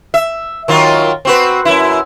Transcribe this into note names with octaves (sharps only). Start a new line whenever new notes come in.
E5
D#3 F#3 F4
C4 F#4 B4
F#2 E4